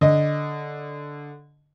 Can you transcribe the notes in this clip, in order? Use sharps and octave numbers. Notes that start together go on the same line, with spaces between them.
D3 D#5